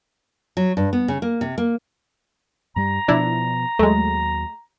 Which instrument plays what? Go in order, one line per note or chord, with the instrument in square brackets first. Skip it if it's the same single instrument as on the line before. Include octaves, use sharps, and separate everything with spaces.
[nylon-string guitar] F#3
G2
B3
C#3
A#3
C3
A#3
[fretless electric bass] G2 G3 [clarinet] A#5
[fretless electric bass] B2 F3 [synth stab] D4 E4
[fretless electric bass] D#2 F#3 [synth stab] G#3 A3